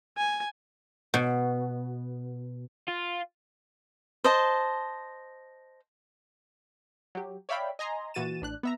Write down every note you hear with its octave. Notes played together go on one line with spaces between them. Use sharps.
G#5
B2
F4
C5 D#5 A5
F#3 G4
C#5 D5 E5 F5 G5 B5
D#5 G#5 A#5 C6
A#2 E3 F#4 A6 D#7 E7
A1 D4 F#6
B3 E5 A#5